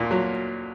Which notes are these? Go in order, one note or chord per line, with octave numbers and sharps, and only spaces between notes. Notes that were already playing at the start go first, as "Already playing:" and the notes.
Already playing: D2 A#2 A#3
F#3